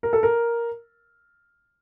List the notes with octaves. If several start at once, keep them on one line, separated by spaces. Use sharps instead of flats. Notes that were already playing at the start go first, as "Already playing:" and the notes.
A#4
A4
A#4